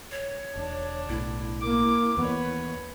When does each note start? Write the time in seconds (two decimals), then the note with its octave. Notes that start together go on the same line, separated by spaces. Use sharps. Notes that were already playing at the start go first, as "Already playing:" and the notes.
0.11 C#5
0.56 E1 D4
1.09 B1 A2 E4
1.60 A#3 D6
2.17 D#2 E3 B3 B4 C#5